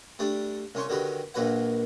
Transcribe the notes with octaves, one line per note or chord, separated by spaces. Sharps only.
G3 A3 D4
C2 C#4 C6 C#6
D3 D#3 F#3 G4 B4
A#1 A#2 F#3 B4 F#5